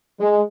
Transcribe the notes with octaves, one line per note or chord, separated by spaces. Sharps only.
G#3